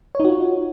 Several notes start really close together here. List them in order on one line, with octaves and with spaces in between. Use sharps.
C#5 D#4 F#4 F4